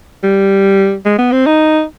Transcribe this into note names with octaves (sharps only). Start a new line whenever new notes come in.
G3
G#3
B3
C4
D#4